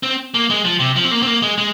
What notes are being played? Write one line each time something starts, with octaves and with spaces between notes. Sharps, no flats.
C4
A#3
G#3
F3
C3
F3
C4
A#3
C4
A#3
G#3
G#3